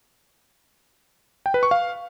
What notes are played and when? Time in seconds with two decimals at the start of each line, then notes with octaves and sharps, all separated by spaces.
1.46 G5
1.54 B4
1.63 C#6
1.71 F5